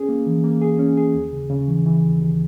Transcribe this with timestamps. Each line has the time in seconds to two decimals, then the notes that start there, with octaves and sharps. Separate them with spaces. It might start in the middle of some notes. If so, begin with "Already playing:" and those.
Already playing: C#4 G#4
0.09 A#3
0.26 E3
0.44 A#3
0.61 G#4
0.79 C#4
0.97 G#4
1.14 D#2
1.32 C#3
1.50 C#3
1.68 E3
1.86 E3
2.03 D#2
2.20 D#2